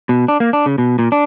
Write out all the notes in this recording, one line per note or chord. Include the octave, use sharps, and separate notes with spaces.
B2
D4
A#3
D4
C#3
B2
A#2
D4